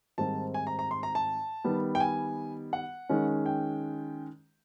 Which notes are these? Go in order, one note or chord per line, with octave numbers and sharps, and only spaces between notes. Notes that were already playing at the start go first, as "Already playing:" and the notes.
G#2 D#3 G3 C4 A5
G#5
A#5
A#5
C6
A#5
A5
D#3 G3 B3
G5
G#5
F#5
D#3 G#3 C#4
G5